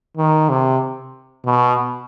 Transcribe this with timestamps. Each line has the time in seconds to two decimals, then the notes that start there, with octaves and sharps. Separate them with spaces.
0.17 D#3
0.49 C3
1.46 B2